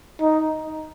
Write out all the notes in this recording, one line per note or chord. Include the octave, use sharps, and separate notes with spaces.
D#4